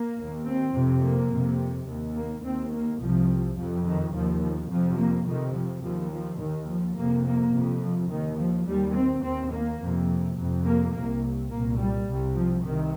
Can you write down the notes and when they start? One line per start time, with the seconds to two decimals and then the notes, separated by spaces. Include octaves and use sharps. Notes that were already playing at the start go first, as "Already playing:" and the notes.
Already playing: A#3
0.17 D#2
0.46 C4
0.73 F2 C3
1.03 A#3
1.31 F2 C3
1.87 D#2
2.15 A#3
2.44 D#2 C4
2.72 A#3
3.00 C2 C3 F3
3.57 F2 C3 F3
3.85 D#3
4.14 D#2 F3
4.42 F3
4.70 F2 C3 F3
4.98 A#3
5.27 F2 C3 D#3
5.55 F3
5.83 D#2 F3
6.12 F3
6.40 D#2 D#3
6.69 F3
6.96 F2 C3 A#3
7.25 A#3
7.54 F2 C3
7.82 F3
8.10 D#2 D#3
8.39 F3
8.67 D#2 G3
8.95 C4
9.23 D#2 C4
9.52 A#3
9.81 F2 C3
10.37 F2 C3
10.65 A#3
10.94 C2 C3 A#3
11.50 C2 A#2 A#3
11.78 G3
12.07 C2 C3
12.35 F3
12.63 C2 C3 D#3